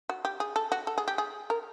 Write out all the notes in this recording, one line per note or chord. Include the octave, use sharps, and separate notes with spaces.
F#4
G4
G#4
A4
F#4
A4
G#4
G4
G#4
A#4